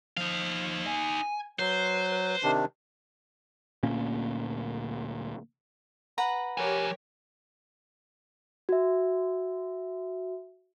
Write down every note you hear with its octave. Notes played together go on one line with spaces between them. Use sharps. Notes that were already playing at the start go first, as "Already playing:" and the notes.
F3 D#4 F5
G#5
F#3 B4 C5
C3 D#3 D4
D2 A#2 A#3 C#4
B4 F#5 A#5
F3 G4 A#4 C#5 G#5
F#4 E5